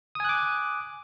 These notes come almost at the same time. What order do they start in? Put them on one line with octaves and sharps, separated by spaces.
D#6 G#5 F#6 D6